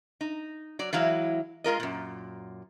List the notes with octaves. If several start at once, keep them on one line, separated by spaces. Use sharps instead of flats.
D#4
F#3 D5
E3 F#3 G#3 E4 F5
G#3 F4 A#4 D#5
F#2 A#2